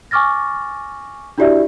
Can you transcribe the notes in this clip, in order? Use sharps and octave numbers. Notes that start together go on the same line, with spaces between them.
G#5 C#6 D6 F6 A6 A#6
D4 E4 F#4 G4 D5 E5